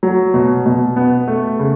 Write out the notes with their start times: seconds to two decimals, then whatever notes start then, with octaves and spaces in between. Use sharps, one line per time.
0.03 F#3
0.34 B2
0.66 B2
0.96 B3
1.28 A3
1.59 C#3